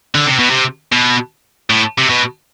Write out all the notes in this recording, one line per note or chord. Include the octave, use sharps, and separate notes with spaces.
D3
C3
B2
C3
B2
A2
C3
B2